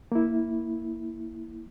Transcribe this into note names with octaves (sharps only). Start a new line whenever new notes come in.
A#3 E4